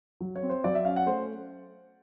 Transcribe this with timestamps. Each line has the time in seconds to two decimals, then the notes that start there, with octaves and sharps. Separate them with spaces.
0.20 F#3
0.36 C#5
0.43 C4
0.50 C5
0.64 F#3 D5
0.75 E5
0.85 C#4 F5
0.96 F#5
1.06 A3 C5